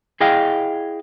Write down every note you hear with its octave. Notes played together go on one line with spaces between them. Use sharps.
E4 G#4 D#5 F5 G5